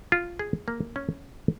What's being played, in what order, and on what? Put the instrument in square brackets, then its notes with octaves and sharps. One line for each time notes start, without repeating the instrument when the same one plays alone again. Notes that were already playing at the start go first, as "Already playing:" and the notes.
[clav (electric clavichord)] F4
G#4
A#3
C#4